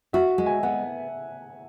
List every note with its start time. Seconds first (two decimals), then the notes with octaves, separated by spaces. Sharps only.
0.13 F#4 E5
0.38 G#3
0.46 G#5
0.63 B3 F#5